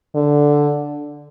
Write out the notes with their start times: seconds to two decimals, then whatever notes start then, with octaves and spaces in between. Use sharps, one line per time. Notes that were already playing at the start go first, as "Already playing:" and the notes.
0.15 D3